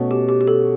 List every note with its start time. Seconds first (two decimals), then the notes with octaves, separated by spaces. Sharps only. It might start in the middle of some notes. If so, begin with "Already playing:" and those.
Already playing: B2 A3 C#4
0.11 G4
0.29 G4
0.41 G4
0.48 A4